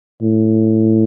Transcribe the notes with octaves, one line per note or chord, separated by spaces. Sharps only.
A2